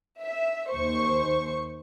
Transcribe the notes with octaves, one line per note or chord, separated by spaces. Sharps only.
E5
D#2 C5 C#6